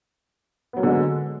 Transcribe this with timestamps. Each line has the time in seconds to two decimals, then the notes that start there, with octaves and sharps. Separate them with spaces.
0.73 B3
0.77 F#3
0.80 A#3
0.83 D3
0.87 G#3